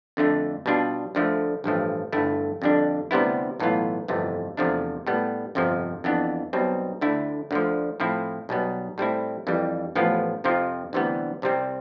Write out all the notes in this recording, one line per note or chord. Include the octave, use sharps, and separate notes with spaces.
F2 D3 A3 D4
B2 G3 D4 F4
D2 D3 F3 A3
A1 G2 F3 A3
G1 G2 D3 A3 E4
F2 D3 G3 D4
D2 C3 G3 B3 E4
B1 A2 E3 B3 F4
G1 F2 C3 E3 A3
E2 C3 F3 A3 D4
A2 G3 B3
G1 F2 C3 F3
F2 E3 B3 D4
B1 B2 G3 C4
D2 D3 A3 E4
D2 D3 F3
A2 F3 C4 E4
B1 B2 G3 B3
A2 G3 C4 E4
F2 E3 G3
A1 A2 F3 B3 F4
F2 C3 F3 C4 F4
D2 C3 E3 G3 B3
C2 C3 G3 C4